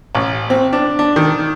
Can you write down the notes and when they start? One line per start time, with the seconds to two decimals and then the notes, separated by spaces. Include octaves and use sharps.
0.15 A1
0.50 C4
0.73 D4
0.99 D4
1.16 D#3